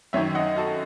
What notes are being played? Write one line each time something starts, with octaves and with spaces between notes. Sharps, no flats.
F#2 D#3 C#5 E5
D#5 F#5
F#4 A4